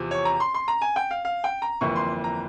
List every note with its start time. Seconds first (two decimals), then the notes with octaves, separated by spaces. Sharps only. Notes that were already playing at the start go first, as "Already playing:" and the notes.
Already playing: E2 C3 F3 C4
0.11 C#5
0.25 A#5
0.40 C6
0.54 C6
0.68 A#5
0.82 G#5
0.96 G5
1.11 F5
1.25 F5
1.44 G5
1.62 A#5
1.81 G1 F2 E3 A#3 C#6
1.96 C6
2.24 A#5